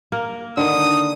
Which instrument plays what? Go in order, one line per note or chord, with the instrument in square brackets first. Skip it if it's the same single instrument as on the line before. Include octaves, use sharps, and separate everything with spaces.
[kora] A#3 A#4
[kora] D3 D#3 [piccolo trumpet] D#6